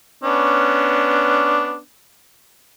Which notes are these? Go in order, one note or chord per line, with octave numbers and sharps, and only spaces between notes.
B3 C#4 D4